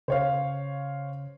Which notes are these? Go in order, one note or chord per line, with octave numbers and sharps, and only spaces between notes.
C#3 C5 C#5 F5